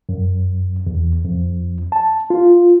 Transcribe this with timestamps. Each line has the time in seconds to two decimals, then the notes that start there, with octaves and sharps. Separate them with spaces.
0.09 F#2
0.87 E2
1.25 F2
1.92 A5
2.30 F4